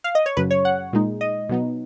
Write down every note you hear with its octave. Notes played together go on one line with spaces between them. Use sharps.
F5
D#5
C#5
F#2 C#3 F#3 B4
C#5
F#5
A#2 G#3 D#4
D#5
B2 F#3 B3 D#4